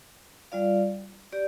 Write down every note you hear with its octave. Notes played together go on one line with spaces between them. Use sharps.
G3 F4 D5 F5
G4 D5